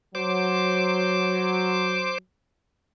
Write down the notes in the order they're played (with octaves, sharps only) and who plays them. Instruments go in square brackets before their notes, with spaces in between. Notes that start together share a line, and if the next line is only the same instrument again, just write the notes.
[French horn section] F#3 [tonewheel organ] C5 D6